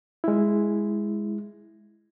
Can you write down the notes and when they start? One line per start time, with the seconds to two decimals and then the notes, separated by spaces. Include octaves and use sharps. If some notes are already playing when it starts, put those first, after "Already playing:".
0.24 G#3 E4